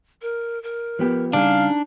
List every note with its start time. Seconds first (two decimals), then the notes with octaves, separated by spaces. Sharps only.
0.22 A#4
0.63 A#4
0.99 F3 B3 G4
1.33 C#3 G3 D4 D#4 G#4 F5